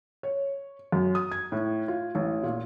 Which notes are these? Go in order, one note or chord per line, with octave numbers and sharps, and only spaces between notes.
C#5
F#2
D#6
G#6
A2
F4
A1
A#2